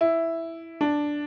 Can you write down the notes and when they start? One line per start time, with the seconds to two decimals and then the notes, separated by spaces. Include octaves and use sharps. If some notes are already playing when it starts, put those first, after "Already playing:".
0.01 E4
0.81 D4